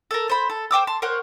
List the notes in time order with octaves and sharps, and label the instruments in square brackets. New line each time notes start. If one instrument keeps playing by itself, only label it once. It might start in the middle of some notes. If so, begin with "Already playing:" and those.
[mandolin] A4 A#4
C5 B5
A4
C5 G5 D6 E6
A5 C6
A#4 C5 C#5 F#5